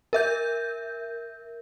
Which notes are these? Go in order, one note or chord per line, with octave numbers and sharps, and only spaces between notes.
A#4 E5 G6